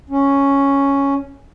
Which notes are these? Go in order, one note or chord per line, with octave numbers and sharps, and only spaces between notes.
C#4